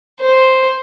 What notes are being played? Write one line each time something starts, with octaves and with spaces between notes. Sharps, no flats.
C5